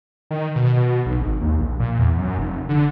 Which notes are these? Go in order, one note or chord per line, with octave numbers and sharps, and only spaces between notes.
D#3
B2
B2
B1
G#1
D#2
A#1
A#2
E2
F#2
F1
D3